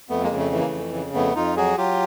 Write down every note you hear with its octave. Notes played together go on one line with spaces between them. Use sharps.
F2 A3 B3
G#3 A#3
C#3
A3
E3 A3
A#3
A3
F2
C#3
F2 A3 B3
F2 D#4 F4
F#3 F#4 G#4
F#3 F4 G4